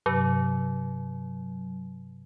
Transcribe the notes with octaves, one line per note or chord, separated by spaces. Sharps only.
G2 C3 F#3